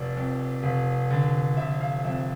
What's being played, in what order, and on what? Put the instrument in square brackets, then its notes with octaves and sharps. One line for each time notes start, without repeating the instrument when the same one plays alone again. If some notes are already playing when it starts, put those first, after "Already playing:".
Already playing: [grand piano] F1 D5
F2
F1
D3
F1 E5
F5
F2 E5